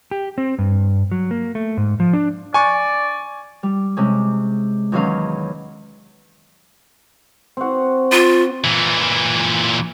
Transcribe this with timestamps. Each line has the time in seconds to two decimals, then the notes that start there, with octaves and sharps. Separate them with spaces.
0.11 G4
0.38 C4
0.59 G2
1.12 F#3
1.31 A#3
1.55 A3
1.77 G#2
2.00 F3
2.13 D4
2.54 D5 G#5 C#6
3.63 G3
3.97 C3 G#3 C#4
4.92 E2 D#3 F#3 C#4 F5
7.57 C4 F#4
8.12 F4
8.64 A#2 E3